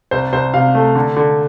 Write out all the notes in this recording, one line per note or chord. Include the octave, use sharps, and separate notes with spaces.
C2 C5
C2 C5
C3 F5
A3
D3
D3